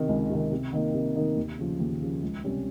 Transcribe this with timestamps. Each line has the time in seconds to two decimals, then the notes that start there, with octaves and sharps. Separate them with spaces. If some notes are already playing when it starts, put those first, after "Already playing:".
Already playing: C3 D#3
0.09 C#2
0.30 C3 D#3
0.52 C3
0.73 D#3 A#3 D#4
0.94 C3
1.16 D#3 A#3 D#4
1.37 D#2
1.59 C#3 F3
1.80 D#2
2.01 C#3 F3
2.23 C#2
2.44 C3 G3 C#4